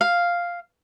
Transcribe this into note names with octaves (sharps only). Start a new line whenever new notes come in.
F5